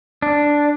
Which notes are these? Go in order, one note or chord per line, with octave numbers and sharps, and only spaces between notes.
D4